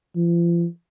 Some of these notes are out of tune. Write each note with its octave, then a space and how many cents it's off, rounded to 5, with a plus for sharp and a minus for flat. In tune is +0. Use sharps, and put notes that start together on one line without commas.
F3 -40